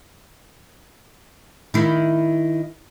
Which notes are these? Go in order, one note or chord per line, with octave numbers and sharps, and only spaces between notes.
D#3 E4